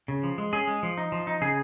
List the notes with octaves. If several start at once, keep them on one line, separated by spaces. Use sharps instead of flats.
C#3
F3
G#3
C#4 G#4
G#3
F3
D#4
F3
D#4
C#3 G#4